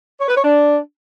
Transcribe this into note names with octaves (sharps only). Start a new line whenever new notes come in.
C#5
B4
C#5
D4